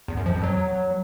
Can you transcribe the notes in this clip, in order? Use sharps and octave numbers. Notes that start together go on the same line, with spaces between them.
E2
F#2
F3
F2
F#3